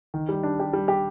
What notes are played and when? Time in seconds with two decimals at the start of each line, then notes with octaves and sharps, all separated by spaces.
0.14 D#3
0.29 G3
0.43 D4
0.59 G4
0.73 G3
0.88 G4